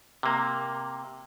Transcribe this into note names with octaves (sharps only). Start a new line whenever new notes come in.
C3 A#3